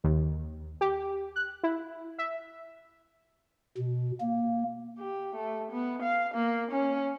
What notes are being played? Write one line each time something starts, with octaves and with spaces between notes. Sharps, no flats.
D#2
G4
F#6
E4
E5
B2
A#3
G4
A3
B3
F5
A#3
C#4